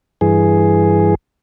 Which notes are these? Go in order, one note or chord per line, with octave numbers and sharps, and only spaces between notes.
G2 E3 G#4